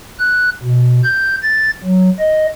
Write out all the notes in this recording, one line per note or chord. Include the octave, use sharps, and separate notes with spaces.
F#6
B2
G6
A6
F#3
D#5